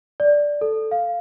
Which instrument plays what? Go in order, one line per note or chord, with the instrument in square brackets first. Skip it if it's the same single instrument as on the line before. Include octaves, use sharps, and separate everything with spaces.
[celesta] D5
A4
F5